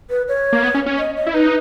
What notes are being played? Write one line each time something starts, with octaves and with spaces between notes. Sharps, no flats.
B4
C#5
A#3
B3
C#4
C#4
D#5
D#5
E4
D#4 B4